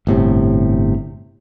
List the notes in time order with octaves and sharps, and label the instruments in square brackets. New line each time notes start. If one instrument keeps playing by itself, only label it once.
[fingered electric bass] G1 A2 C3